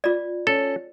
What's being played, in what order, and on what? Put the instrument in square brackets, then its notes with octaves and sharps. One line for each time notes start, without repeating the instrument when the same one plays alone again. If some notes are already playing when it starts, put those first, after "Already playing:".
[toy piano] F4 D5
[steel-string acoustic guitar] C#4 [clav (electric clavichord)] A4